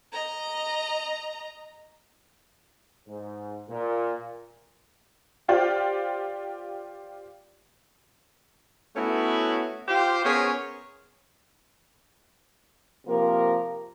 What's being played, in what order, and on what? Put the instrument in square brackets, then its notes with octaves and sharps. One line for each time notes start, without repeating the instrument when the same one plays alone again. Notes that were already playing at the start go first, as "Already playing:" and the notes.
[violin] D#5 A#5
[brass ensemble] G#2
A#2
[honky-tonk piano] F4 G4 C5 D5 F5 F6
[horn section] A3 B3 C#4 E4 F#4
F4 G4 C5
B3 C#4 G#4 A#4 C5 C#5
[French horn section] C3 F3 A#3 A#4